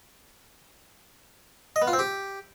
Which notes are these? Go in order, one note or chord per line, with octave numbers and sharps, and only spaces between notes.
D#5
B3
F4
C4
G4